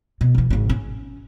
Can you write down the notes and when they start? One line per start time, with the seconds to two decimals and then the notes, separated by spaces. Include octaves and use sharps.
0.21 B2
0.35 E1 E3
0.50 G#1 C#3
0.69 C#4